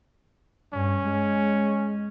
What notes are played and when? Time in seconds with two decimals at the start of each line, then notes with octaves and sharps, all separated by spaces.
0.73 G2 C#4
1.06 G#3